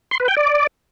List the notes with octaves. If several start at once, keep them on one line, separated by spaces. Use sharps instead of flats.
C6
B4
G5
D5